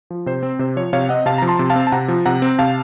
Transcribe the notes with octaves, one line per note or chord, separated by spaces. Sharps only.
F3
C3 C5
C4
C3 C5
F3 C#5
C3 C#5 F5
C4 D#5 F#5
C3 F5 A5
F3 A#5
A5 C6
C3
F5 A5
C4
A5
C3 F#5 A#5
F3
C3 F#5 A#5
C4
C3 F5 A5